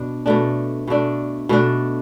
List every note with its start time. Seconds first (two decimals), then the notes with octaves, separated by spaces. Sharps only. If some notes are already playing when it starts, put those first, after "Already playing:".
Already playing: B2 D4
0.26 B2 A3 D4
0.88 B2 A3 D4
1.49 B2 A3 D4